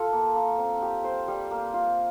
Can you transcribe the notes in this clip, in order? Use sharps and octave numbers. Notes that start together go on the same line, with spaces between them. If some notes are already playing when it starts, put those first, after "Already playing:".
Already playing: F4 A4
A#3
A#3
C4
G4
C5
G3
A#3
F4